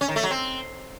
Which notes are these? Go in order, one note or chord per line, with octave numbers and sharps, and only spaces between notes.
C#4
D#3
A3
F#3
C4